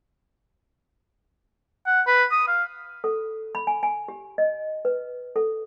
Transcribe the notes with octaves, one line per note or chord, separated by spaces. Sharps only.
F#5
B4
D#6
F5
A4
B5
G#5
G#5
G4
D#5
B4
A4